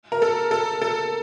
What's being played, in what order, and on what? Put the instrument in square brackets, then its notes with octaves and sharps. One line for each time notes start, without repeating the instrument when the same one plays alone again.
[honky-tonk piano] A#4
A4
A4
A4